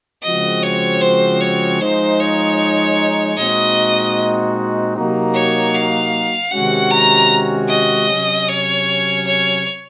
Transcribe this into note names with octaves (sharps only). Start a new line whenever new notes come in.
C#3 F3 G#3 C4 F#4 D#5
C#5
C5
C#5
F3 G#3 D#4 C5
C#5
A#2 G#3 C4 D#4 F#4 D#5
C3 F#3 A#3 D#4 F#4
C#5
F5
C3 D#3 G#3 C#4 F#4 F#5
A#5
D#5
C3 F#3 C#4
C#5
C#5